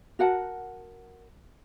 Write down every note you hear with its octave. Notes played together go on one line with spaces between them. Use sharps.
F#4 A#4 F#5 A5